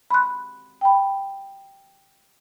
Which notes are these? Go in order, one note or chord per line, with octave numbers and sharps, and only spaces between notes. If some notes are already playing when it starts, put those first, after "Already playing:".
B5 C6 F#6
G5 B5